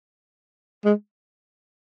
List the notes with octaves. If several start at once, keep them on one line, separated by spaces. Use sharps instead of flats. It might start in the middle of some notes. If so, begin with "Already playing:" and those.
G#3